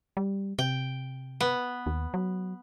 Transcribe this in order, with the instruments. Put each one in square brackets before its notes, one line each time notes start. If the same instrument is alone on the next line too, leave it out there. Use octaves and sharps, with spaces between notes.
[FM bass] G3
[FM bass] C3 [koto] G5
[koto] B3
[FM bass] D#2
F#3